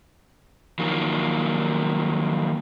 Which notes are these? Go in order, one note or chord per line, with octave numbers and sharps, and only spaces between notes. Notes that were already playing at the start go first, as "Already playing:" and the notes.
D#3 F3 F#3 A#3